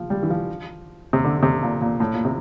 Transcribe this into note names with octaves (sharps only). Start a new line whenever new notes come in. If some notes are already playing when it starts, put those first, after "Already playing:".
Already playing: F3
G3
E3
F3
C3
D3
C3
A#2
A#2
A2
A#2
C3